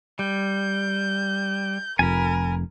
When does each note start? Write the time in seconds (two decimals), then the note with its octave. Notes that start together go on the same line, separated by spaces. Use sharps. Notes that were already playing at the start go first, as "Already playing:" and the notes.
0.19 G3 G6
1.99 F1 F2 A#4 G#5 B5